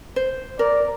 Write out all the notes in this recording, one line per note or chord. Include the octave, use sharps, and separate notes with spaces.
C5
A#4 D5